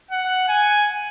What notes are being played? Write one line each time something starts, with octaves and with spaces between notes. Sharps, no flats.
F#5
G#5